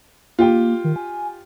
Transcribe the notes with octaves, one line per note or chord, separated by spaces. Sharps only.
A#3 F4 G4 G5
D#3
G#5